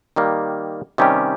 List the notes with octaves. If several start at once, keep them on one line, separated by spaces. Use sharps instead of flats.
D#3 G3 A#3
C3 D#3 G3 C#4 G4